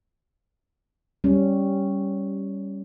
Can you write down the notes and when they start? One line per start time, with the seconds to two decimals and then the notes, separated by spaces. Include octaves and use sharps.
1.24 G3 C#4